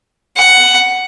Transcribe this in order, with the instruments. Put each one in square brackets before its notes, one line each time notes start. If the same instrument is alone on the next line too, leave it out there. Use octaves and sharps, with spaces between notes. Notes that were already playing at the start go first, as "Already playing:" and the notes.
[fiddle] F#5